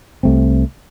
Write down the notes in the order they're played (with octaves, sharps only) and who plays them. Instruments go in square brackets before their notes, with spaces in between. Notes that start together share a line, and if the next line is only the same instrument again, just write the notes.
[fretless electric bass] C2 C3 A3 C4